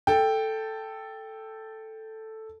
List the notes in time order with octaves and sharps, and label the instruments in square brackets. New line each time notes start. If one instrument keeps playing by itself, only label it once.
[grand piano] A4 G5